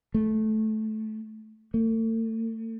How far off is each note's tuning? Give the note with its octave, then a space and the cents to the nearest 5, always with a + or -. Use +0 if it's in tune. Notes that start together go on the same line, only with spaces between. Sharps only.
A3 -15
A3 +40